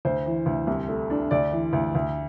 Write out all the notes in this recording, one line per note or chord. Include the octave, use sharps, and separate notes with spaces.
D2 C5
E3
D2
C2
A3
D4
D2 D5
E3
D2
D2